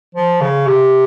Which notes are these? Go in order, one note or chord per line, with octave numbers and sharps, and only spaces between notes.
F3
C#3
C3